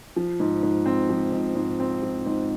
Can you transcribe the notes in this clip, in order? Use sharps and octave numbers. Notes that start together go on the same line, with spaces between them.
F3
G#2
G#2
C4
F3
G#2
G#2
C4
F3
G#2